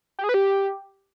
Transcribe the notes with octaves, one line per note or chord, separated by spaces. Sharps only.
G4
G#4
B4
G4